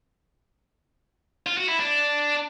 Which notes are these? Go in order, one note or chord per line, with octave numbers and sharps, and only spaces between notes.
F4
F#4
E4
D4